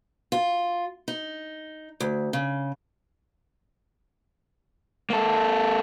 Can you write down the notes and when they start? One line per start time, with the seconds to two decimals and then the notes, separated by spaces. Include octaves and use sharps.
0.32 F4
1.08 D#4
2.00 D2
2.33 C#3
5.10 A#3 A4